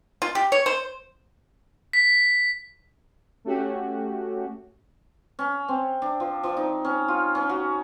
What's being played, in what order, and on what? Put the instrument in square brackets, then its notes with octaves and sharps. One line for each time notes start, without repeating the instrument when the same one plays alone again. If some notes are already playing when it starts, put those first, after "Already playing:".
[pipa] F4
G4
C#5
C5
[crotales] B6
[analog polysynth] A3 C#4 F#4 G4
[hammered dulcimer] C#4
C4
D4
F3
F3
D#4
C#4
F4
C#4
F#4